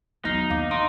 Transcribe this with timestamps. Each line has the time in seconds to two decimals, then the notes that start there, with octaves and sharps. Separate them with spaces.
0.25 D#2 F#3 B3 D#4 F6 C7
0.50 D#2 F5 D6
0.71 C#3 D#4 C6 D7